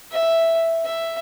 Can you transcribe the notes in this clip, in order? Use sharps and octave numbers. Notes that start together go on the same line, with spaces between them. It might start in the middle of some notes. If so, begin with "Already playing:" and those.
E5
E5